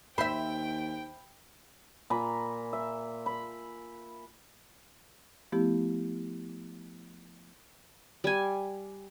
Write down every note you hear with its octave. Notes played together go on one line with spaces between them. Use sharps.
D#2 C5 E5 G5 B5
A#2 G#5 A#5 B5
E5
B5
F3 A3 B3 E4 G4
G3 G#5